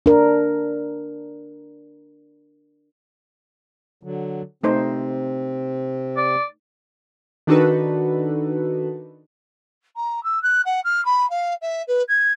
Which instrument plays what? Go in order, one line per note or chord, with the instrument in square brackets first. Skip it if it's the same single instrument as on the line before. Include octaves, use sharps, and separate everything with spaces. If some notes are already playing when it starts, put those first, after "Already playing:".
[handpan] D4 A#4
[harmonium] D3 F#3
[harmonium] C3 C4 [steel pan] A3 D#4 C5
[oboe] D5
[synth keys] D#3 D4 D#4 F#4 A4 B4
[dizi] A#5
E6
F#6
F#5
F6
B5
F5
E5
B4
G#6